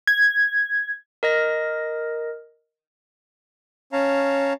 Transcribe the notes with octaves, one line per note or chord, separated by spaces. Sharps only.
G#6
A#4 D#5 A#6
C#4 C#5 F5 A5 A#5